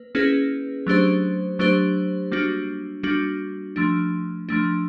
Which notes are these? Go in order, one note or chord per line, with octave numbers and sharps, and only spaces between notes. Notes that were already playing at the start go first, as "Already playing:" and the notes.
Already playing: A#3 B4
A#3 C#4 E4 G#4 B4
F#3 A3 D4 G4 C5
F#3 A3 D4 G4 C5
G3 A#3 D4 F#4
G3 A#3 D4 F#4
F3 A3 D4
F3 A3 D4